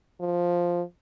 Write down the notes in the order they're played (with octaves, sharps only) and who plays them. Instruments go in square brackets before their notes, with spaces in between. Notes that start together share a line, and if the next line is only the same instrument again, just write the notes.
[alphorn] F3